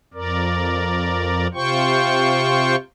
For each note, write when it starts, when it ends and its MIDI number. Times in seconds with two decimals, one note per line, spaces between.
0.14 1.47 41
0.14 1.47 70
0.14 1.47 74
1.54 2.76 48
1.54 2.76 65
1.54 2.76 72
1.54 2.76 79
1.54 2.76 85